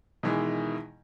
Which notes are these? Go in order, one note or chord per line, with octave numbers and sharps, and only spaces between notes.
B2 D#3 E3 G#3